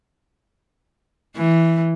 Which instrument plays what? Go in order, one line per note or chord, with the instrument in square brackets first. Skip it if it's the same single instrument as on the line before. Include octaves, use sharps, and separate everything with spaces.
[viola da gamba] E3